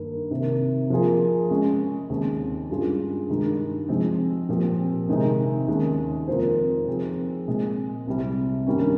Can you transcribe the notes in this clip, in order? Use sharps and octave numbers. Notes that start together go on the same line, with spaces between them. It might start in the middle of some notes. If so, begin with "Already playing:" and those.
Already playing: G2 D#3 A#3
C3 D#3 A#3
F3 A#3 F4 G#4
C#3 G#3 C#4
D#2 C#3 G#3 C4
G2 G3 C#4 F4 G#4
G2 D#3 G#3 D#4
F3 G#3 C4
A#2 F3 C4 G4
C3 D#3 G#3 C4 D#4
D#2 D#3 G#3 C#4
F2 D#3 A#3 F4 C5
F3 C4 D#4 G#4
A#2 G#3 C4
C2 C3 G3
G2 D#3 G3 A#3 C#4